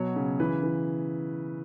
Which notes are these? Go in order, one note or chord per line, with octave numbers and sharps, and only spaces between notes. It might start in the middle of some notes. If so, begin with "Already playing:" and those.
Already playing: B2 F#3 C#5
C#3
E3 B4
E3